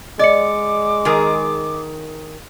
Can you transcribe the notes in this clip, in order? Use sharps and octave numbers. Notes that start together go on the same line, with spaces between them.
G#3 D5 D#5 D6 C#7
D#3 G#4 A#4